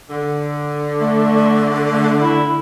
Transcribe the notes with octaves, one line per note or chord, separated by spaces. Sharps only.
D3
A3
A3
E4